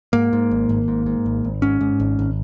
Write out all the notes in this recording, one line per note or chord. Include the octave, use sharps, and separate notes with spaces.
G#2 A#3
G#2
G#1
G#1
G#2
G#2
G#1
G#1
G#2 C#4
G#2
G#1
G#1